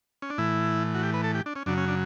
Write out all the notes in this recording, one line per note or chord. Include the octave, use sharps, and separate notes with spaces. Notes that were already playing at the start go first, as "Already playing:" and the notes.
C#4
D4
A2 E3 E4
F#4
G4
B4
A4
G4
D4
C#4
F#2 C#3 F#3 D4
C#4
D4